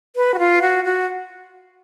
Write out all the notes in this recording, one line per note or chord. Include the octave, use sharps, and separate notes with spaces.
B4
F#4
F4
F#4
F#4